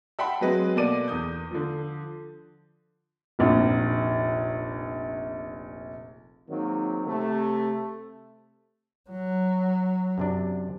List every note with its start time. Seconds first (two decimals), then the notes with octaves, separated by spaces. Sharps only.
0.19 E5 F#5 G5 A5 B5 C6
0.41 F#3 G#3 C4 F#4 B4 D#5
0.76 B2 A#3 A4 D5 D6 D#7
1.08 E2 E3 D#6 G6
1.51 D3 F3
3.39 F1 A#1
6.48 G#2 D#3 F#3 A#3 C4
7.06 C3 A3
9.10 F#3
10.18 F#2 C3 D4